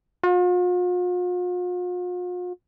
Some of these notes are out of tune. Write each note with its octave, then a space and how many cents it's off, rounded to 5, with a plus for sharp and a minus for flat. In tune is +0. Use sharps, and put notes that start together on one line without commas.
F4 +45